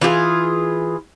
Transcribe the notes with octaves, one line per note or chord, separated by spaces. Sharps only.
E3 F4 G4 G#4